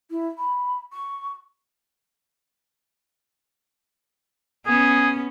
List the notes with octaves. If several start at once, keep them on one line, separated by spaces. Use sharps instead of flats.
E4
B5
C#6
B3 C#4 G#4